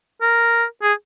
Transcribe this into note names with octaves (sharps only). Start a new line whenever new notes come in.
A#4
G#4